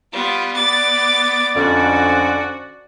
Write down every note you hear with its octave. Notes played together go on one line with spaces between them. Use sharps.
G3 B3 F4
B3 D5 D6 A6
F2 D3 C#4 F#4